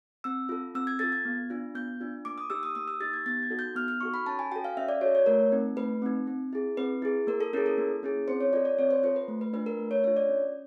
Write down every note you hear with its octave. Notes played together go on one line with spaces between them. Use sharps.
C4 E6
F4 A4
C4 E6
G#6
F4 A4 A6
G#6
B3
D4 F4
B3 G6
D4 F4
A#3 D6
D#6
D#4 G4 E6
D#6
A#3 D#6
E6
D#4 G4 A6
G#6
B3 A6
G#6
D#4 F#4 A4
G6
B3 F6
F6
D#4 F#4 A4 C#6
B5
C#4 A5
G#5
F#4 A4 G5
F5
C#4 E5
D5
F#4 A4 C#5
C#5
A3 A#4
C4 D#4
A3 B4
C4 D#4
C4
E4 G#4
C4 B4
E4 G#4
A#3 A#4
A4
C#4 E4 G#4 A#4
A4
A#3
C#4 E4 G#4
C4 C5
C#5
F4 A4 D5
D5
C4 C#5
C5
F4 A4 C5
B4
A3
B4
D4 F4 B4
A#4
A3
C#5
D4 F4 C#5
D5
C#4